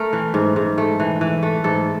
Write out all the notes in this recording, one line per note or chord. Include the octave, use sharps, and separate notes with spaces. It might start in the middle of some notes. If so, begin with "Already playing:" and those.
Already playing: A3 A#4
E3
G#2
G#2
A3
E3
E3
A3
G#2 A4